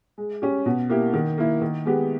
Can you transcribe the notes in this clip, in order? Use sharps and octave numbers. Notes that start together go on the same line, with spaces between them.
G#3
C#4 G4
B2
A#3 E4 G4
D#3
A#3 E4
D#3
G#3 B3 G4